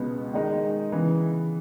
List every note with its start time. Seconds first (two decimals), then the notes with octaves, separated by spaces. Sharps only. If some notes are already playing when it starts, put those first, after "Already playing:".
Already playing: C#2 B2 G#3 B3
0.33 D#3 G#3 D#4
0.92 C#3 E3 B3